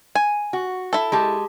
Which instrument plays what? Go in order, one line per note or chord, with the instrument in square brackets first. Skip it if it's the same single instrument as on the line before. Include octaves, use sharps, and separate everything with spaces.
[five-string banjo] G#5
[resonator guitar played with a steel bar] F#4
[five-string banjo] E4 A4
[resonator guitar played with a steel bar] G#3 G4 A5